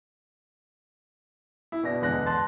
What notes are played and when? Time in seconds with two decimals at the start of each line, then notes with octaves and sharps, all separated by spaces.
1.72 E4
1.83 B2 D4 A#6
2.02 E2 D3 G#3 F#6 A#6
2.26 A5 C6 F#6 A6